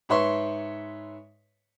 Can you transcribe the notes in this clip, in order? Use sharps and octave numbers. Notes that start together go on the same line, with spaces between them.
G#2 B4 C#5 E5 C6 C#6